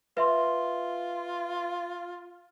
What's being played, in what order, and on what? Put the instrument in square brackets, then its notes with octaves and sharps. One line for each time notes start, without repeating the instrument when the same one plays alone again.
[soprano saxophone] F4 [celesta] B4 E5 C6